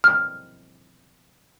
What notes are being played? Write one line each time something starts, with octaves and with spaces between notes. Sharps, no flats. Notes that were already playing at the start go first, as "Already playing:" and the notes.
F6